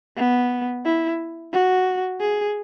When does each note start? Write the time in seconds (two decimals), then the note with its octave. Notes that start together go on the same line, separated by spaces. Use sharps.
0.17 B3
0.85 E4
1.53 F#4
2.21 G#4